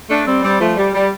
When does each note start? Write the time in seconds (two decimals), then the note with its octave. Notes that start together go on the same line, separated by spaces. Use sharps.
0.09 A3 D4
0.26 G3 C4
0.42 G3 C4
0.59 F3 A3
0.76 G3
0.93 G3